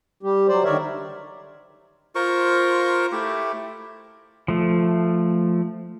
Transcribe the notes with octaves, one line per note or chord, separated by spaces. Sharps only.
G3 G4
F#3 C5 D5
D3 D#3 A#4 C#5 D5 E5
F4 A#4 C5 C#6
A3 E4 G4
F3 A3